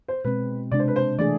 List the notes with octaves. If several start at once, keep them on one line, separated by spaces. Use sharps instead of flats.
C5
B2 G#3 C4 B4
C3 G#3 D4 D5
C5
B4
C5
E3 A3 D4 G#4 D5